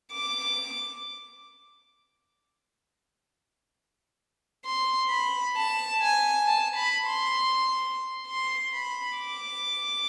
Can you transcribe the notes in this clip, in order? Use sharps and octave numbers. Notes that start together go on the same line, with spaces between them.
D6
C6
B5
A5
G#5
A5
B5
C6
C6
B5
D6